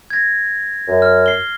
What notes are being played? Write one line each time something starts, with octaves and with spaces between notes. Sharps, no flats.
G#6 A#6
F#2
F6
C7 G7